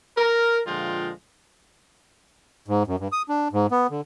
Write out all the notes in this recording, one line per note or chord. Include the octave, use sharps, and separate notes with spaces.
A#4
A#2 D3 F3 G#3 F4 G5
G#2
F#2
G2
D#6
D4
G#2
B3
D3